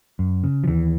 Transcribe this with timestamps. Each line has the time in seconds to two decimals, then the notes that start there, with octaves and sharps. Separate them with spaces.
0.19 F#2
0.44 C#3
0.64 F3
0.68 D#2 E3